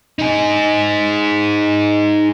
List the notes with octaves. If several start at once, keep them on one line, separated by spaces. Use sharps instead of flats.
D#4 G#4